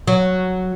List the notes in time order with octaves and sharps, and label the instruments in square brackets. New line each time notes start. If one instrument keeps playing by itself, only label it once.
[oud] F#3